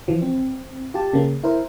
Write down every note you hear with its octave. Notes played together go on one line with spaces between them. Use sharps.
E3 F3
C4
F4 G4 A5
C#3 A#3
E4 A#4 C5